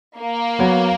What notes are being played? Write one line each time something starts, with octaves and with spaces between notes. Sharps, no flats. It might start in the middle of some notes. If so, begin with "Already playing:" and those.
A#3
F#3 B3 F#4 C#5